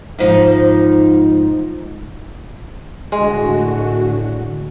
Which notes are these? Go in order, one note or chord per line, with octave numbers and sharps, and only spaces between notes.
G#2 F3 D#4
A2 D3 G#3 F#4